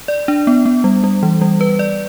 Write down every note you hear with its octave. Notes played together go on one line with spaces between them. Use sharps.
D5
D4
B3
B3
G3
G3
E3
G3
B4
D5